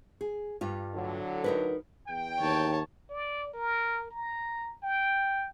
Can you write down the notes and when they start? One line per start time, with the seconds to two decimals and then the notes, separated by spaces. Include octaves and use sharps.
0.21 G#4
0.61 G2 G3 F4
0.94 A2 D3 F#3
1.44 D#4 A#4 B4
2.09 E2 G5
2.40 D#2 C#5 A5
3.10 D5
3.54 A#4
4.11 A#5
4.83 G5